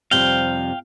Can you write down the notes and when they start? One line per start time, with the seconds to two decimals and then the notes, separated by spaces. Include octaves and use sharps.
0.11 F2 C3 G3 F5 G5